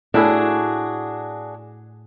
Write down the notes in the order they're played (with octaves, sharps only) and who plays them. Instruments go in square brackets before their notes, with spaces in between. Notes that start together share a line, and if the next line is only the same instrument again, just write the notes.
[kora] A2 E4 [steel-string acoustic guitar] D4 F#4 G#4